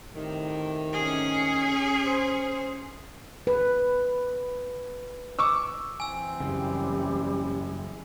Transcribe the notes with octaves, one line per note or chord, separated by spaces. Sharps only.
A2 C3 D#3
C#4 G#4
C5
B4
C#6 D6 E6
E3 C4 G#5 E6
F#2 C#3 G3